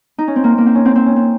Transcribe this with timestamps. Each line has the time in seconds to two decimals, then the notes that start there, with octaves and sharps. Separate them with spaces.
0.18 D#4
0.28 C#4
0.36 C4
0.44 A#3
0.58 A#3
0.66 C4
0.75 C#4
0.85 C4
0.95 C4
1.06 C#4
1.16 C4